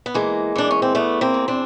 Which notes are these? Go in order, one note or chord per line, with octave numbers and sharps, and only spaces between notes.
B3
E3 G#3 A#3
E3 D4
C#4
C4
E2 A3 B3
A#3 C4
E2
C4 D4